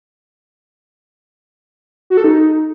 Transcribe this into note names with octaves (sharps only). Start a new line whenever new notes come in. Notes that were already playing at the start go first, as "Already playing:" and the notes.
F#4
A4
D#4